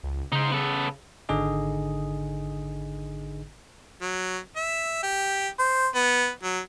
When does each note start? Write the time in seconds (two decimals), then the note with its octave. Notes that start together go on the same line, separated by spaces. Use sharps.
0.03 C#2
0.32 C#3 D#4 C5
0.52 B3 A4
1.29 G#1 D3 D#4 G#4 D#5
4.02 F#3
4.56 E5
5.03 G4
5.59 C5
5.95 B3
6.43 F#3